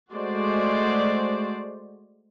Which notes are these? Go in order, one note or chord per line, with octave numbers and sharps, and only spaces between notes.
G#3 A3 F#4 C5 D5